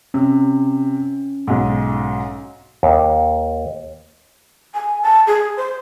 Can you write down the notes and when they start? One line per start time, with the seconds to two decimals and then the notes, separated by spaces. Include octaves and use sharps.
0.14 C3 C#4
1.47 B1 G#2
2.83 D#2
4.74 G#5
5.02 A5
5.27 G#4
5.57 C5